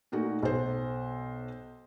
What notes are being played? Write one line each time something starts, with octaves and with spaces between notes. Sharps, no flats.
A#2 A3 A#3 D#4 F#4
B1 C5